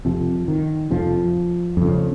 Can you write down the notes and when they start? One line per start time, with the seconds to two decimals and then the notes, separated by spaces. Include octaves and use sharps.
0.05 F2 C3 F3
0.48 D#3
0.91 F2 C3 F3
1.77 F2 C#3